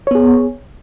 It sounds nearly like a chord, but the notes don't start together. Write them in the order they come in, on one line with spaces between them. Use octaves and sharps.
C#5 B3 G#4